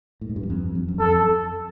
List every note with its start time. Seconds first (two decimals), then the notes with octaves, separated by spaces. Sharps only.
0.21 A2
0.29 G#2
0.36 G2
0.43 F#2
0.50 F2
0.75 F2
0.88 F#2
0.99 F2 A4